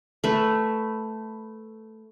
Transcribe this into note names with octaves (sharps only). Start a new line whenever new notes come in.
A3 B4